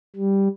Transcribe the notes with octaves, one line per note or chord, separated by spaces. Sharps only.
G3